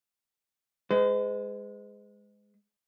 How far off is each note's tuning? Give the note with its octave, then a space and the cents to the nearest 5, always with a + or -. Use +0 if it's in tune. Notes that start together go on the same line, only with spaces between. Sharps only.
G#3 +0 C5 -45